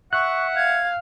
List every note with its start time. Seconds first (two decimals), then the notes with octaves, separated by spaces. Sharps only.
0.13 E5 F#5 C#6 F#6
0.55 F5 G#6